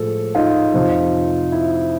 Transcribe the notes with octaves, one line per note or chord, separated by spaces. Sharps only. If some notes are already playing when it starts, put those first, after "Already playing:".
Already playing: A2 F3 G#3 A4
D#4 F4
F2 C3 F3
E4